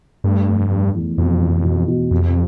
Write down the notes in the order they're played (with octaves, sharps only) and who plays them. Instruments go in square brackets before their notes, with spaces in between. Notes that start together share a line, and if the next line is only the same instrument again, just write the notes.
[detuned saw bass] G2 [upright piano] A3
[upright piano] F1
F1
E2
[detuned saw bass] F2 [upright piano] B2
[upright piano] E2
B2
B2
[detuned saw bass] F2 [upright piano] C3